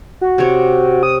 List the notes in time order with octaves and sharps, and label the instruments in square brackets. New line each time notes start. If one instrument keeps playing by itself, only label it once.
[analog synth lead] F#4
[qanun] C3 C#5
[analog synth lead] D#6